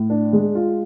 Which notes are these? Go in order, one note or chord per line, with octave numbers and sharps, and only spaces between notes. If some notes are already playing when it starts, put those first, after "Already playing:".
Already playing: A2
D4
G#3
F4